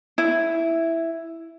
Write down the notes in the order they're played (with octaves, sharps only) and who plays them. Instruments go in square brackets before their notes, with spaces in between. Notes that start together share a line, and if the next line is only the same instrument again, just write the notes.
[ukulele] E4